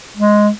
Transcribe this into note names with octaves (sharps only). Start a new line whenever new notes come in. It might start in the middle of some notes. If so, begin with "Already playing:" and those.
G#3